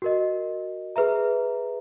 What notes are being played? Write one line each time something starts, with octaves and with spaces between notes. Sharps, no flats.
F#4 A#4 D#5
G#4 B4 E5 A#5